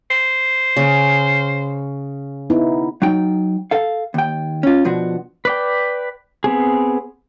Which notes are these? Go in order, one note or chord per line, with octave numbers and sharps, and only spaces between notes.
C5
C#3
B3 D#4 E4
F#3 D#4 G5
A4 F5
D#2 G5
C#4 F4
B2 F3 D4 F#4
B4 D5 G5
B3 C4 G#4